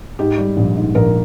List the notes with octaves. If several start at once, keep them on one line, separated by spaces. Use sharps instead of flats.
G#2 G4
G3
A#1
G#2
A#1 A#4